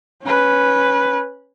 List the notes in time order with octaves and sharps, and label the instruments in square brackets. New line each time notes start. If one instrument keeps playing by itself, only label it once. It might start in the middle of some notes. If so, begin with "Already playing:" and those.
[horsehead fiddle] C#4 B4